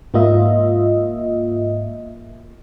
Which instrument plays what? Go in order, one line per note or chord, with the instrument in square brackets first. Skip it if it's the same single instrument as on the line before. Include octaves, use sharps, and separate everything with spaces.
[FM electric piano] G#2 A#3 F4 D#5 E5